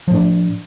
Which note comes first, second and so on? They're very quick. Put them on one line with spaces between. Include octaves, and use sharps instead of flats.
F3 A2 D4